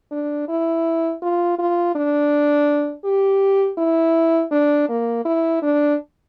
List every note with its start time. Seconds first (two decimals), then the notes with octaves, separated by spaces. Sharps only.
0.12 D4
0.49 E4
1.22 F4
1.58 F4
1.95 D4
3.05 G4
3.78 E4
4.51 D4
4.89 A#3
5.25 E4
5.62 D4